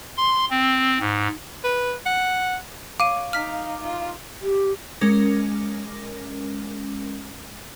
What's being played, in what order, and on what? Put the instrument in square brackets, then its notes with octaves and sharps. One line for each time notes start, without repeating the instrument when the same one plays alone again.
[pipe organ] C6
C4
G#2
[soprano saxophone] B4
F#5
[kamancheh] C#5 [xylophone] F5 D#7 [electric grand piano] D6
[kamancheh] D#4 F5 [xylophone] F6 B6
[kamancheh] D#4 F4
[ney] G4
[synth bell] G#3 C#4 A#4 D6 A#6